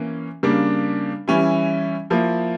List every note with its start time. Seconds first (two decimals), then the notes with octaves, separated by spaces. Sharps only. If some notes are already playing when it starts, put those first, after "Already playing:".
Already playing: E3 A#3 C#4
0.43 C#3 G3 A#3 D4
1.28 E3 G3 C#4 E4
2.10 F3 A#3 E4